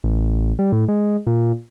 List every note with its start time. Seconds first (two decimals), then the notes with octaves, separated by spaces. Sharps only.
0.04 A1
0.59 G3
0.72 A2
0.88 G#3
1.27 A#2